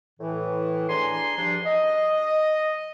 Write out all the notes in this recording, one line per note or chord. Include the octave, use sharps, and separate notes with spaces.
A2 E3
D4 G#4 G#5 A#5 C6
G2 F3 D4
D#5